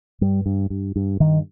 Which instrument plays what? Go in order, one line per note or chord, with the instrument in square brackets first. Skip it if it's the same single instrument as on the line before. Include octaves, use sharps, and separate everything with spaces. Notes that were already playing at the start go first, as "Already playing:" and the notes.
[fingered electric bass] G2 G3
G2
G2
G2
G2 D#3